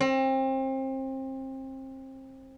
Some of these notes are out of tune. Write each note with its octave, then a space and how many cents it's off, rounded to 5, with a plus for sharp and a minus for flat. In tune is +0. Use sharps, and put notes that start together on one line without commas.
C4 +30